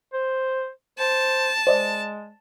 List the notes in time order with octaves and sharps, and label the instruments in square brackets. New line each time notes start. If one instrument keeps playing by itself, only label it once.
[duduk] C5
[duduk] C5 [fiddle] A5
[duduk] G#3 [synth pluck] C5 D5 D#5